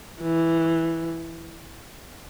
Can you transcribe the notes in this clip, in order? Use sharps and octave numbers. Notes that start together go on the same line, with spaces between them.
E3